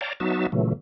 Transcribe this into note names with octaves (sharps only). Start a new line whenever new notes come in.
C#5 D5 F5 G5 A5 A#5
F#3 B3 D#4 F#4 E5 A5
A#2 C#3 E3 F#3 A3